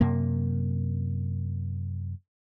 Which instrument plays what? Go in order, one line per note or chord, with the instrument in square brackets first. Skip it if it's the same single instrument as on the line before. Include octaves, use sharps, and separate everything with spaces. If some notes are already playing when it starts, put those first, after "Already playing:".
[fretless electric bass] F#2 C3 A#3